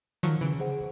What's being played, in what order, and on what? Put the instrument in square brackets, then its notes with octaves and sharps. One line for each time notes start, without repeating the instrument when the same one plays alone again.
[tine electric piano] D#3 [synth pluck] F3 F#3 C#5
[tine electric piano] C#3 [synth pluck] E3 D7
[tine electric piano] G#4 C5 F#5